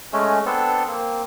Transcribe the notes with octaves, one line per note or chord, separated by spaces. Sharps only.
G#3 A3 C#4
B3 C4 D4 A4
A#3 C4